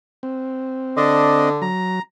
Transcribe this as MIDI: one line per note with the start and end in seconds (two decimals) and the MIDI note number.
0.23 1.50 60
0.97 1.67 50
0.97 1.49 62
0.97 1.49 75
1.62 2.00 54
1.62 2.02 82